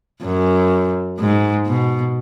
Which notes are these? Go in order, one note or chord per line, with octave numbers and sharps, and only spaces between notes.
F#2
G#2
B2